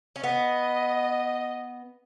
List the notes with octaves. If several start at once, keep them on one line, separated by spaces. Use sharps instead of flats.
C#4
B3 D#5